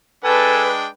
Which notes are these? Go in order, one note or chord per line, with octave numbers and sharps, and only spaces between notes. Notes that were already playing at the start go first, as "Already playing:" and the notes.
G#3 D4 A4 B4 G5 G#5